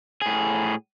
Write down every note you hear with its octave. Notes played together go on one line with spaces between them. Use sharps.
A2 G#4